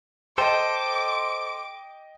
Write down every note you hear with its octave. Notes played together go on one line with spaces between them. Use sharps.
A4 C5 D#5 G5 D6